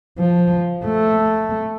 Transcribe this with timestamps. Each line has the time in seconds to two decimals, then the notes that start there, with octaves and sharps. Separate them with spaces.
0.19 F3
0.86 A3